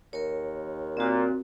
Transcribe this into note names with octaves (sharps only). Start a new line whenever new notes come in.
D#2 A#4 C#5
A#2 C4 F#4